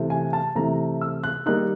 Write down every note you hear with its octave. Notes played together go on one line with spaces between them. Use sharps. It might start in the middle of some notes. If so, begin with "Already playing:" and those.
Already playing: C3 E3 A3
G#5
A5
C3 E3 A3 A#5
E6
F#6
D#3 G3 A#3 D#4 F#6